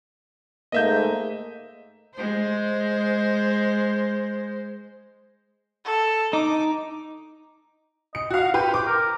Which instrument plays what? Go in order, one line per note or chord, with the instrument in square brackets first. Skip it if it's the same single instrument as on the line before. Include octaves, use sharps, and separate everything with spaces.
[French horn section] G#2 A3 A#3 [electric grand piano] D#5 E5 G6
[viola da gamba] G#3 C5
[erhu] A4
[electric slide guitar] D#4 [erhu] D6
[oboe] D#5 [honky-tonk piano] C#7
[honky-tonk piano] F#4 F5 [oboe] F#5
[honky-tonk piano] G4 B4 [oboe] C5
[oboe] G5 [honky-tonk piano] D6
[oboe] A#4